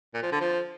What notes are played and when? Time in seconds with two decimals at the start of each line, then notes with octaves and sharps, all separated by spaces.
0.14 A#2
0.23 F3
0.32 D3
0.40 F3